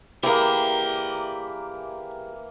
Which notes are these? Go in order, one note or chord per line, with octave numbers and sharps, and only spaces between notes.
E3 A#3 G4 G#4 A#4 D5 E5